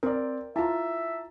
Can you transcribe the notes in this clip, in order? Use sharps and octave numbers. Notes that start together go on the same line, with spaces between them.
C4 A#4 D5
E4 F4 E5 A5 A#5